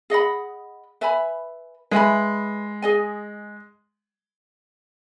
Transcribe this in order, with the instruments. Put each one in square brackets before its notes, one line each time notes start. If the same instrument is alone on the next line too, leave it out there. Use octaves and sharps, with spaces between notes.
[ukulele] G#4 D#5 F#5 B5
B4 E5 G#5 B5
[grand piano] G#3 [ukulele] B4 E5 G#5 B5
[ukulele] G#4 D#5 G#5